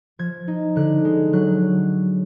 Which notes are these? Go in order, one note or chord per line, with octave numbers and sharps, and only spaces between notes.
F3 G#6
D#4
D3 F#6
G#3
F#3 F#6